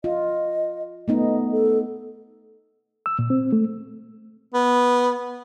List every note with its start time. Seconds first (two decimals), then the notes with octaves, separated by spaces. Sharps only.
0.04 F4 D#5
1.08 A3 B3 D#4 D#5
1.52 A4
3.06 E6
3.19 A#2
3.30 C4
3.53 A3
4.54 B3